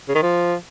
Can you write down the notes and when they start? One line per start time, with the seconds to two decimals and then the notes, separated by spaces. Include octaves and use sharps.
0.08 C#3
0.15 D#3
0.23 F3